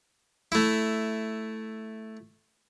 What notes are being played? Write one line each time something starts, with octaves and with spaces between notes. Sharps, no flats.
A3 E4